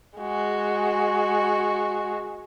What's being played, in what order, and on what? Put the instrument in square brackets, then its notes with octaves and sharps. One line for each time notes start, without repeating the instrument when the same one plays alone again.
[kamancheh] G#3 F#4